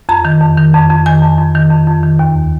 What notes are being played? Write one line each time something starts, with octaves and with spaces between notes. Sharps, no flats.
F2 A#5
D#3
F2
D#3
F2
F2
D#3 G#5
F2
F2
D#3
F2
F2
D#3
D#2